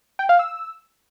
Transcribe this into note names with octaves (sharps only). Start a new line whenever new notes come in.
G5
F5
E6